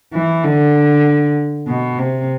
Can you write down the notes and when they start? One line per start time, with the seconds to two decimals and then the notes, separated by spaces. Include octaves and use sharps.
0.14 E3
0.44 D3
1.68 B2
1.99 C3